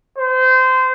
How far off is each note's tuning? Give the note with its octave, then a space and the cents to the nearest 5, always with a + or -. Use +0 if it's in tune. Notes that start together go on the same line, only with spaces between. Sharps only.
C5 -25